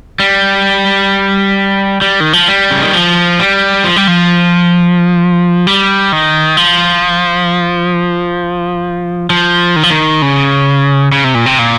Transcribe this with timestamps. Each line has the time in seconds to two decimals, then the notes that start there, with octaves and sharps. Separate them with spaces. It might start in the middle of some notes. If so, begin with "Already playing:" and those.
0.20 G3
2.02 G3
2.20 D#3
2.33 F3
2.48 G3
2.70 C#3
2.82 D#3
2.93 F3
3.39 G3
3.84 F3
3.96 G3
4.08 F3
5.67 G3
6.12 D#3
6.57 F3
9.30 F3
9.76 D#3
9.83 F3
9.90 D#3
10.22 C#3
11.12 C#3
11.24 C3
11.35 A#2
11.46 C3
11.59 A#2